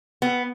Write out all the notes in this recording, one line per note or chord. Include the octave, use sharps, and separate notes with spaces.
B3